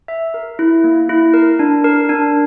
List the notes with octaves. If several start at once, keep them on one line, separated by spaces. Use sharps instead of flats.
E5
A#4
E4
A#3
E4
A#4
D4
A#4
D4